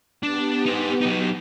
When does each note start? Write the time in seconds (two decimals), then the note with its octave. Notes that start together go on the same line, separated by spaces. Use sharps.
0.23 B3 D4 G4
0.66 D#4 C5
1.01 F#3 D#4